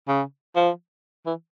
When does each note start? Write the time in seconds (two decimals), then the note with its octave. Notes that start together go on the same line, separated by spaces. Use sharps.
0.08 C#3
0.56 F3
1.26 E3